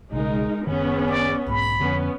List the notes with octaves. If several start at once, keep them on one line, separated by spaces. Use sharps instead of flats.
B1 C#3 G#3 D#4 A#4
F#1 D#3 B3 C#4 G#4
D5
B1 G#2 B5
F2 D3 B3 C#4